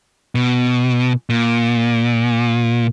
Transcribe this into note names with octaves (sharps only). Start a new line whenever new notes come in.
B2
A#2